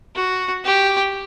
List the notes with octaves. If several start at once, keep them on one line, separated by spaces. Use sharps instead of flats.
F#4
G4